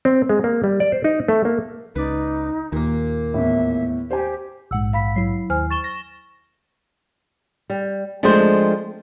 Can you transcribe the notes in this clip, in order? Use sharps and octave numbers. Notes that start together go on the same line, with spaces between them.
C4
G#3
A#3
G3
D5
C5
D#4
A3
A#3
C#2 D#4 B4 D5
D#2 A#2 A#3
E2 A2 E5
G4 C5 G#5
A#1 G#2 F#5 E6
F5 B5 B6
F#3 E4 C7
D#2 C5 G#5 F6
C#6 A6 E7 G7
A#6
G3
F3 G#3 A3 C4 D4 C5